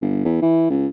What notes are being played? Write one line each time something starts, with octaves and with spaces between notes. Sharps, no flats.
G1
E2
E3
C#2